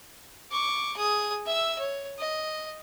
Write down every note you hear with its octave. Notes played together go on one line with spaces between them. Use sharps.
C#6 D6
G#4 D#6
E5 E6
C#5
D#5